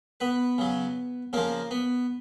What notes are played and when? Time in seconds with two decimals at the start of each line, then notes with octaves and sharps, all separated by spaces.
0.20 B3 B4
0.58 C#3 F#3
1.33 C#3 F3 A#3 A#4
1.71 B3